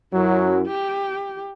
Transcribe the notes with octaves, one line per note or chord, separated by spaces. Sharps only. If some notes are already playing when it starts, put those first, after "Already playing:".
F#2 F#3 E4
G4